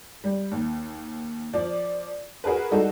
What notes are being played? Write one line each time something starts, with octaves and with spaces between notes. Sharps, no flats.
G3
D#2
F3 D5
F#4 G#4 A#4 B4
G3 G#3 D#4 F#4 A4